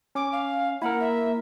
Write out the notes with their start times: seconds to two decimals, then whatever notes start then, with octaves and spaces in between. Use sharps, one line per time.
0.15 C#4 D6
0.32 F5
0.82 A#3 E4 A#4 F#5
1.00 E5